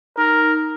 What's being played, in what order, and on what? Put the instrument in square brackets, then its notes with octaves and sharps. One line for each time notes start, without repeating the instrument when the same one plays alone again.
[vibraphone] D#4 [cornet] A#4